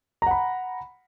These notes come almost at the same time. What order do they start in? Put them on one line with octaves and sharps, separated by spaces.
A#5 F#5 B5